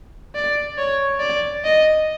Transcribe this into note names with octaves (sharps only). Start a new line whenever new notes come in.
D5
C#5
D5
D#5